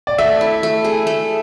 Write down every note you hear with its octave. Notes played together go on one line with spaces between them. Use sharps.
D5
A3 E5
E4
A3
G#4
A3